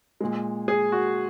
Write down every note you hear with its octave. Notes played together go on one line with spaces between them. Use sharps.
A#2 G#3
G#4
F#4